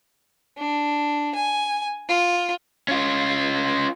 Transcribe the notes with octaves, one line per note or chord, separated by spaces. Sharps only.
D4
G#5
F4
C#4 F4